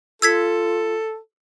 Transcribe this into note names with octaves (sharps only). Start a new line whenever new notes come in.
F4 A4 E6 G#6 B6